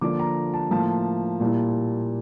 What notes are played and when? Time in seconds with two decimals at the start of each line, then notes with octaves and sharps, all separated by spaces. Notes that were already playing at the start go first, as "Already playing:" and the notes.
0.01 D3 F3 A#3 D4 D6
0.19 A#5
0.54 A5
0.71 A2 F3 A#3 A5
1.40 A#2 G3 A#3 E4